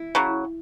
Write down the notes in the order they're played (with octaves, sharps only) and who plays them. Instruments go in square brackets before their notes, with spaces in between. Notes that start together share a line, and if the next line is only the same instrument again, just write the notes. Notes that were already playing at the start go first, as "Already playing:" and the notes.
Already playing: [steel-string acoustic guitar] E4
[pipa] C#3 F#3